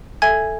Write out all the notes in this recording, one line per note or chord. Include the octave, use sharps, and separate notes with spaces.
A4 E5 G#5 G#6